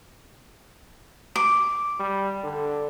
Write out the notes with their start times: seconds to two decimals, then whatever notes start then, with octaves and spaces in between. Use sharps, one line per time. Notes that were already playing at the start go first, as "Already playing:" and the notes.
1.36 D6
1.99 G3
2.44 D3